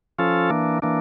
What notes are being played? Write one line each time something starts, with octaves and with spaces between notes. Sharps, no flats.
F3 C#4 F4 A4
E3 A#3 D4
E3 A#3 D4